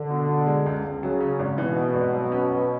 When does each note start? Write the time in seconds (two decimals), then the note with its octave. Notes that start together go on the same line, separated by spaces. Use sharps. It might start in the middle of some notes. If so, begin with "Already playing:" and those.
Already playing: D3
0.10 B2
0.28 B2
0.47 G#3
0.66 C#2
0.85 C#2
1.03 C#3 F#3
1.20 C#4
1.39 G#1
1.57 B2 E3
1.77 B3
1.94 G#1
2.13 F#3
2.32 C#4
2.50 B1